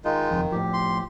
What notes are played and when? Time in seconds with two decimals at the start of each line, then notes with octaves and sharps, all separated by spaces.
0.05 D#3 G#3 D#4 F4
0.31 F#1 F2 F3
0.51 A2 F3 G4
0.73 C6